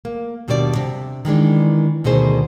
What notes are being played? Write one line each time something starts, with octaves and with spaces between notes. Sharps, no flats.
A#3
D#2 B2 G3 D4 F4 D5
C3
D#3 E3 G#3 D4
D2 B2 D#3 G#4 C5